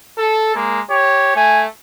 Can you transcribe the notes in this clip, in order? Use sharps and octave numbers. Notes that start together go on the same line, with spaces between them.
A4
G#3 A#3
G4 C#5
A3 G#5